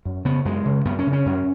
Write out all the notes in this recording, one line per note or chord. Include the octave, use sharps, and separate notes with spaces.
F#2
C#3 B3
F#2 G#3
C#3
F#2 B3
C#4
C#3
C#4
F#2